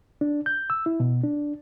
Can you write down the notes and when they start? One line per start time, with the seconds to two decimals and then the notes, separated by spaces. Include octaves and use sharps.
0.21 D4
0.46 G6
0.70 E6
0.86 E4
1.00 B2
1.24 D4